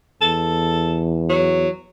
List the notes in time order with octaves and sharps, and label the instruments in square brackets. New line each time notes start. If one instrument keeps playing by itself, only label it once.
[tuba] E2 [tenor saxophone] A4
[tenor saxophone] F#3